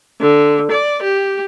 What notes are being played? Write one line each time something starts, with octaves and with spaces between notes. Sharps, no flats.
D3
D5
G4